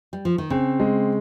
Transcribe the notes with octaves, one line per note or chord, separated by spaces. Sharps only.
G3
F3
D#3
C#3 C4
G#3